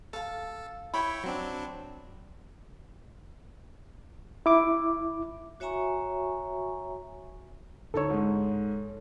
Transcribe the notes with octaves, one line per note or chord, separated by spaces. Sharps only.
A4 F5 A5
E4 C#5 G5 B5
F#3 C4 D4
E4 D6
F#4 C#5 E5 G#5 A#5 C#6
D2 D#4 A4 C#5 E6
G#2 G#3